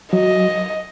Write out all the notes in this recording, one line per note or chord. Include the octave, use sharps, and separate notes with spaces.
F#3 D#5